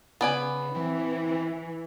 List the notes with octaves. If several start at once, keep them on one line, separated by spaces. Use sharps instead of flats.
C#3 B3 D5 G#5
E3 C4